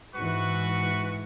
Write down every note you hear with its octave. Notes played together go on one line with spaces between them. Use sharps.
G#2 E3 F#4 B4 C#6